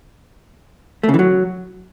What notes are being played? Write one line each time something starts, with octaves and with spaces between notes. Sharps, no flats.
A3
C#3
E3
F#3